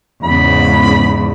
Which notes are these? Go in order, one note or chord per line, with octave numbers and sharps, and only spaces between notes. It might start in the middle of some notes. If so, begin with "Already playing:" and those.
E2 G#2 C#3 B5